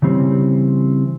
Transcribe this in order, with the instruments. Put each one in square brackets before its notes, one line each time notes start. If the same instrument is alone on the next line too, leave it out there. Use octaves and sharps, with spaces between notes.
[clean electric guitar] C#3 E3 G3 C4 C#4